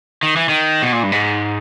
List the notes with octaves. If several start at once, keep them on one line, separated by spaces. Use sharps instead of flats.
D#3
E3
D#3
B2
A#2
G2
G#2